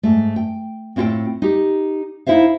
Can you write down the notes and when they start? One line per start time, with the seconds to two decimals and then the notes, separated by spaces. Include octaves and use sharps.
0.03 G#2 A3
0.36 G5
0.96 A2 C4 E4 F4 A4 G5
1.42 D#4 G4
2.26 D#4 E4 C5 E5 F5